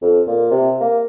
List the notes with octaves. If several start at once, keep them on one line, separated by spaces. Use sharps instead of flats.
F2
A#2
C3
A#3